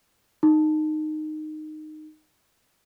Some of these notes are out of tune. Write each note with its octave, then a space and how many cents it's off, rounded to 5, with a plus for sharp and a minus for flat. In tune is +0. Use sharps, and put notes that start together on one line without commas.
D#4 -15